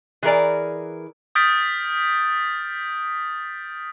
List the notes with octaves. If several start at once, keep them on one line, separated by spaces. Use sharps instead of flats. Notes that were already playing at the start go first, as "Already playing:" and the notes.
E3 G#4 A#4 D5
D#6 F6 G6 A6 B6 D7